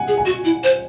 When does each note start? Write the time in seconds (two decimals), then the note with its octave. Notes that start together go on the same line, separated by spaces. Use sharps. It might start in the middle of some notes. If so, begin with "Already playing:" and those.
Already playing: F#5 G#5
0.08 G#4
0.17 G#5
0.26 F#4
0.45 E4
0.64 C5